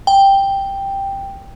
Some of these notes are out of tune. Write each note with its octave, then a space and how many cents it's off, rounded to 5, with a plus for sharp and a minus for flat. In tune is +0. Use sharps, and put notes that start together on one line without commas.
G5 +5